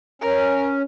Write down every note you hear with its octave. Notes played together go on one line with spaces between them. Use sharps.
C#4 A#4